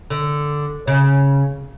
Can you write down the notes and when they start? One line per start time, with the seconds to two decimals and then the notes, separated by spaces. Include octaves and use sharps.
0.10 D3
0.87 C#3